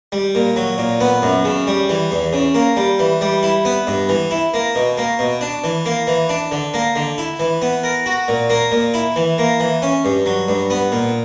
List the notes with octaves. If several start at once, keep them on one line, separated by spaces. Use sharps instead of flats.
G3
A#2
F#3
A#2
B3
F#2
C#3
G3
E3
E2
C#3
A#3
G3
E3
G3
E4
B3
G2
E3
E4
A#3
B2
A#3
B2
D4
E3
A#3
E3
D4
D3
A#3
D3
E4
E3
B3
A#4
F#4
A#2
A#3
A#2
E4
E3
A#3
E3
C#4
G2
F#3
G2
B3
A#2